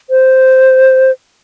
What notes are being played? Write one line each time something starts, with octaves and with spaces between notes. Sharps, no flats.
C5